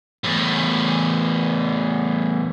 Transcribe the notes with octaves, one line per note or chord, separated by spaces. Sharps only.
E2 A2